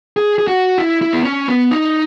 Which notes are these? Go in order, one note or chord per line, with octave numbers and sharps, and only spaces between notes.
G#4
G#4
F#4
E4
E4
B3
C#4
B3
D#4